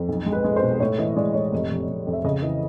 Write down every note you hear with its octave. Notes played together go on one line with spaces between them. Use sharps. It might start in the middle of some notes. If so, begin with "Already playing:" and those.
Already playing: F2
B1
G#3
B4
G#3
C5
B2
A2 C#5
E3 D#5
G#3 D5
A2 C#5
F1
F1
F1
F2
E5
C#3 D#5
E3